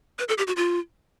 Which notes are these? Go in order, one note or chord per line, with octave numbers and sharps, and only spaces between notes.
B4
A4
G4
F#4
F4